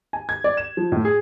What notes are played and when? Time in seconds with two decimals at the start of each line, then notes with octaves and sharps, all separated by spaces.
0.13 G#5
0.29 G#6
0.44 D5
0.57 E7
0.77 F3
0.92 A2
1.05 G#4